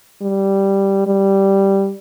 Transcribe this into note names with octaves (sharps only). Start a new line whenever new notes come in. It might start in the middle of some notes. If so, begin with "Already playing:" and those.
G3
G3